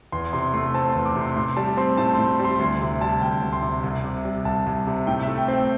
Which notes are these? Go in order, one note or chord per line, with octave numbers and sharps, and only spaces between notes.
E2 C6
C3 C6
A3 C6
C4 A5
C6
E2
D6
C3
C6
A2 C6
G3 A5
C4 C6
A2 A5
C6
A2
G3
C6
D2 C6
C3
G3 A5
D2 G5
D2
C6
C3
C2
C3
G3
C2 A5
C2
C3
A2 G5
E5
A3
G5
C4
G5